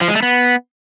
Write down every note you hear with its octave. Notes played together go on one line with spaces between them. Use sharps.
F3
G#3
A3
B3